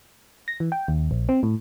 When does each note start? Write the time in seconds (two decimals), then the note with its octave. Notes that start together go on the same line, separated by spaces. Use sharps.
0.48 A#6
0.60 E3
0.72 G5
0.88 D#2
1.11 A#1
1.29 C4
1.43 A2